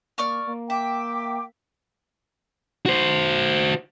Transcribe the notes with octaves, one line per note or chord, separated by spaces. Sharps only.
A#3 D5 C#6 F6
A#3
E5 G5 D6
F#4 C5